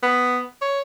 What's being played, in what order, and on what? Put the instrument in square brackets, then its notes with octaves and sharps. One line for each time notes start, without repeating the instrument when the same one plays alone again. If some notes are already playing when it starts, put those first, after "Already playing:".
[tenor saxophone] B3
C#5